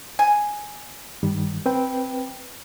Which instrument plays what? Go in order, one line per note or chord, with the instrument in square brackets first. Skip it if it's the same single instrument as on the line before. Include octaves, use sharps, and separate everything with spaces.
[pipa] G#5
[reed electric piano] G2 D#3 G3
C4 B4 G5